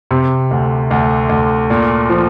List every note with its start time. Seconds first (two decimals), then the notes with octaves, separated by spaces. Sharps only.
0.11 C3
0.51 D2
0.91 D2
1.29 D2
1.70 A#2
2.10 F3